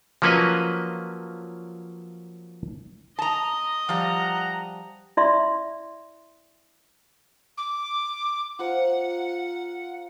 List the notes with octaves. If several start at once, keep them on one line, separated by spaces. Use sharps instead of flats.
F3 F#3 A#3 C#4 B4 D#5
D#5 A5 A#5
F3 G3 F#5 A#5
E4 D5 E5 C6 C#6
D6
F4 C5 F#5 A#5